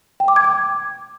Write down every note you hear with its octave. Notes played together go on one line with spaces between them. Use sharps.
G5
D6
G#6
D6